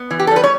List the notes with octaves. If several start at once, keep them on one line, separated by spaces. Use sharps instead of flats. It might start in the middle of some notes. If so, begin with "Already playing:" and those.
Already playing: B3
E3
G4
A4
G3
B4
C#5